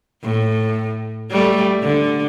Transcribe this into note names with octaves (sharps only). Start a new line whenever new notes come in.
A2
G3 A3
D3